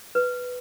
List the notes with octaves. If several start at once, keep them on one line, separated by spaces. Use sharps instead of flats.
B4